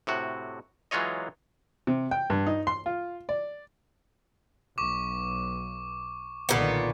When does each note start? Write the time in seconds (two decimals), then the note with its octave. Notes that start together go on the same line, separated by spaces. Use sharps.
0.07 A2 C3 F#4
0.91 E3 F#3 G#3 F4 C#5 D#5
1.87 C3
2.11 G5
2.30 G2
2.47 D#4
2.67 C6
2.86 F4
3.29 D5
4.78 B1 C#6 D6
6.49 B1 A#2 D3 D#3 B3